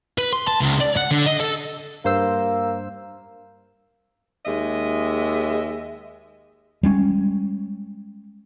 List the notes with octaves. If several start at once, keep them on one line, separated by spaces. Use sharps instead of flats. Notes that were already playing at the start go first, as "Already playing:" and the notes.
B4
C6
A5
C#2
D5
F#5
D3
D#5
A4
G2 A#3 C5 E6
D#2 G#3 D#5 E5
G3 G#3 C#4